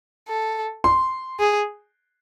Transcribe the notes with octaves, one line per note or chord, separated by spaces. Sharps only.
A4
C6
G#4